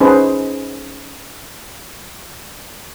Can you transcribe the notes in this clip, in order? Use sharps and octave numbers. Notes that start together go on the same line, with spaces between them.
C#4 D#4 G#4 B4 C5